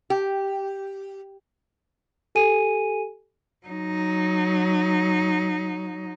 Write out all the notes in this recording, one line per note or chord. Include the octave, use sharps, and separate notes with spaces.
G4
G4 A4 G#5 D#7
F#3 D#4